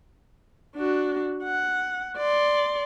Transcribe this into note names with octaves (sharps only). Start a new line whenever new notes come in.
D4 F#4
F#5
D5 C6